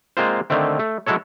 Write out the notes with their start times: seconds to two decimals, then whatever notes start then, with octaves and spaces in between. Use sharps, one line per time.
0.17 G#3 A#3 C4 F4 C5
0.50 D3 D#3 A3 C4
0.79 A3
1.06 F#3 G#3 E4 A4 C#5